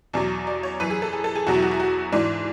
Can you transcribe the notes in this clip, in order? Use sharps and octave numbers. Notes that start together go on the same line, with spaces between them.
E2 B2 F#3 D5
D5
C#5
F#2 E3 B4
G#4
A4
G#4
A4
G#4
E2 B2 F#3 F#4
E4
F#4
E4
F#4
G#2 E3 D4